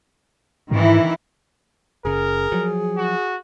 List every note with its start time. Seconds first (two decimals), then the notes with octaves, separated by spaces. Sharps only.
0.71 G#2 D#3 E3 E4
2.05 F#1 C#3 G#4 A#4
2.52 F3 F#3
2.97 F#4